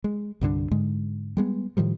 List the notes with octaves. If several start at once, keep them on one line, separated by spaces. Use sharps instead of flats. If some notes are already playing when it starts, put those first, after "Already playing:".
G#3
C2 G2 D3 D4
G#2 D3 G#3
G3 G#3 B3
A2 D#3 F3 G3